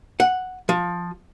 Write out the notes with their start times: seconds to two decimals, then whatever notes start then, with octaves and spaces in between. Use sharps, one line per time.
0.20 F#5
0.69 F3